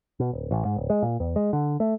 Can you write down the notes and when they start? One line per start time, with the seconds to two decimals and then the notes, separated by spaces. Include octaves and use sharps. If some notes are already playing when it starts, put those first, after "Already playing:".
0.20 B2
0.33 D1
0.51 A1
0.65 G#2
0.76 D1
0.90 G#3
1.02 A#2
1.20 E2
1.36 G#3
1.53 D3
1.80 A3